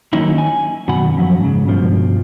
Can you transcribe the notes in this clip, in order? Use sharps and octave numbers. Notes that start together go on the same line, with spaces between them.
D#3 F#3 A#3 C#4 D#4 E4
G#5
F#2 B2 D#3 F#4 F#5 B5
F#2 F3 F#3
G#2 C#3
G2 B2 F3